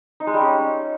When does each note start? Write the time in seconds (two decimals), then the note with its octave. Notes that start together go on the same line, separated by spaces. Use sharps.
0.20 D#4
0.27 G#3
0.34 G3
0.41 C#4